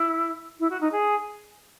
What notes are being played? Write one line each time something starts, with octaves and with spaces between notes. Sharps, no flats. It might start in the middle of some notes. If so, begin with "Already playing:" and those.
Already playing: E4
E4
F#4
D#4
G#4